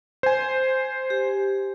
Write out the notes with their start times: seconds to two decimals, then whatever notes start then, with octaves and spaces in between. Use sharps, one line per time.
0.23 C5 G#5
1.10 G4